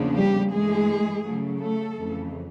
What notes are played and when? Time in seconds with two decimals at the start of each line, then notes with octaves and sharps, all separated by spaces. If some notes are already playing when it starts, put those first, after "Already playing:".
Already playing: E2 C#3 F3 A#3 D4
0.15 G3 G4
0.52 G2 E3 G#3 A3 G#4
1.25 C#3 F#3 A3
1.61 A3 A4
1.98 F2 C#3 E3 A3